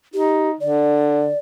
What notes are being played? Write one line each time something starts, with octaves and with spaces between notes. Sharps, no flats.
D#4 G4
D3 D5